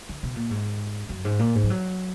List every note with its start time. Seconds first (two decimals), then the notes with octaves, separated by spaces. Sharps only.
0.09 D3
0.23 B2
0.36 A#2
0.51 G#2
1.09 F#2
1.25 G#2
1.39 A#2
1.55 G#2
1.63 F3
1.70 F#3